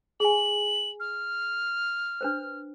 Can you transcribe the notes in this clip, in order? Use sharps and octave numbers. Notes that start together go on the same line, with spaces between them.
G#4 G#5 F#7
F6
D4 B4 C5